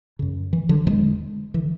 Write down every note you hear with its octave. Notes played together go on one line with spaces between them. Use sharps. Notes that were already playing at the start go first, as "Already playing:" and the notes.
F#2 C#3
E3
D3 F#3
E2 D3 E3 G#3
D3 E3